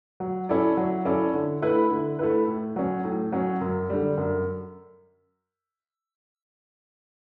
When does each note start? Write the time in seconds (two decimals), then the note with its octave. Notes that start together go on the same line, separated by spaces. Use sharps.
0.20 F#3
0.49 C#4 E4 A4 D5
0.77 F#3
1.05 C#4 E4 A4 D5
1.34 D3
1.62 A3 E4 B4
1.91 D3
2.19 A3 E4 B4
2.48 A2
2.76 F#3 C#4
3.04 A2
3.32 F#3 C#4
3.61 F#2
3.90 D3 G3
4.18 F#2